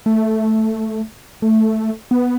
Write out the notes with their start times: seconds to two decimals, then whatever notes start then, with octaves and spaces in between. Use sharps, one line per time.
0.06 A3
1.42 A3
2.11 B3